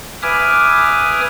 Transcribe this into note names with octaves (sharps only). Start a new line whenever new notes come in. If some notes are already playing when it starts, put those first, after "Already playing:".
B4 E5 G#5 D6 D#6 F6